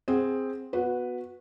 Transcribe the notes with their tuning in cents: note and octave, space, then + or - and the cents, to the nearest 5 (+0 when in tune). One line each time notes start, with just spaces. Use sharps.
C4 +0 G#4 -5 F#5 +0
B3 +0 F#4 -15 B4 +0